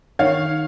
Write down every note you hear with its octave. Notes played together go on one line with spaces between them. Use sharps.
D#3 C#5 F5